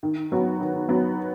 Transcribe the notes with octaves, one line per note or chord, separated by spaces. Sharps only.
D#3
F#3 B3 F#4
D#3
F#3 B3 F#4